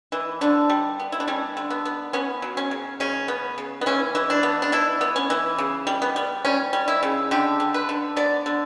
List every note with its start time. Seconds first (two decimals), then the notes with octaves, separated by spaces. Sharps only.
0.12 E3
0.41 D3 D4
0.70 G3
0.99 B3
1.12 E4
1.20 D4
1.28 G3 C#4
1.57 D3
1.70 B3
1.85 B3
2.13 B3 C#4
2.42 F#3
2.57 C#4
2.71 C#3
3.00 C#3 C#4
3.28 B3
3.58 C#3
3.81 B3
3.86 E3 C#4
4.15 E3
4.30 D4
4.43 B3
4.62 D4
4.72 E3 E4
5.01 B3
5.16 C#4
5.30 E3
5.58 C#3
5.87 G3
6.02 B3
6.16 G3
6.45 G3 C#4
6.73 G3
6.88 E4
7.03 C#3
7.31 D3 G4
7.60 D3
7.74 B4
7.89 D3
8.16 B3 D5
8.46 D3